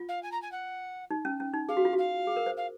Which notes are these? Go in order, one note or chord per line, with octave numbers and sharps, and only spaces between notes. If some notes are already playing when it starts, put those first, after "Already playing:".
Already playing: F4
F5
G#5
A#5
G#5
F#5
D#4
C#4
C#4
D#4
G#4 F5
F#4
F4
F#4 F5
G#4
A#4
C5
F5